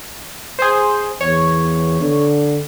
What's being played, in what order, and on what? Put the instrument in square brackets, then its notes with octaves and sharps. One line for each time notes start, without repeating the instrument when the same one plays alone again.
[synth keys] G#4 C5
[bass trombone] E2 [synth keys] C#5
[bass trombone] D3